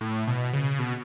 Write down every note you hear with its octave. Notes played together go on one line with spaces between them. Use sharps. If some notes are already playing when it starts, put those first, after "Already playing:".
A2
B2
C#3
B2